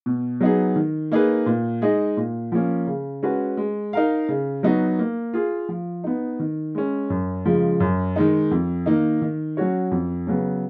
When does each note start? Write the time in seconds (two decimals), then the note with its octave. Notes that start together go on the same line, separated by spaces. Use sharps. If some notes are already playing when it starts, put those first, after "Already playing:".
0.06 B2
0.41 F#3 B3 D#4 G#4
0.76 D#3
1.12 A#3 D#4 G#4 B4
1.46 A#2
1.82 G#3 D#4 G#4 D#5
2.17 A#2
2.52 F3 A#3 C#4
2.87 C#3
3.23 G#3 C#4 F#4 B4
3.57 G#3
3.93 D#4 A#4 F5
4.29 C#3
4.63 F#3 B3 D#4 F#4
4.99 A#3
5.33 F4 G#4
5.69 F3
6.04 B3 D#4
6.40 D#3
6.75 G#3 C#4
7.10 F#2
7.45 C#3 F3 G#3
7.80 F#2
8.16 D#3 G#3 D#4
8.51 F2
8.86 D#3 A#3 D#4
9.22 D#3
9.57 F#3 C#4 F#4 C#5
9.91 F2
10.27 C#3 F#3 B3